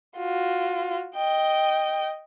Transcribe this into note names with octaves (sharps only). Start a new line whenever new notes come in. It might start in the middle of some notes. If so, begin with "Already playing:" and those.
F4 F#4
D#5 G5